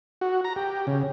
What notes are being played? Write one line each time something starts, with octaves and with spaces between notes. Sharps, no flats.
F#4
A#5
G4
C#3